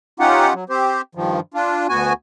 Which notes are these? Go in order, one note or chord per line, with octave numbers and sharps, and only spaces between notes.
C#4 D#4 F4 G4 F#5
F#3
C4 G4 C5
G2 D#3 F3
D4 F4
D2 B3 F#4 G#5